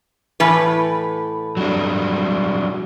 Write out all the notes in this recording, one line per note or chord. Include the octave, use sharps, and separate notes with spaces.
A2 E3 B4
F#3 G3 D4